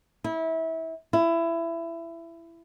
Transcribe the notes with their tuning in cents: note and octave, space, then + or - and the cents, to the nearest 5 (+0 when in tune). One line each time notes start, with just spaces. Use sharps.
E4 -25
E4 +20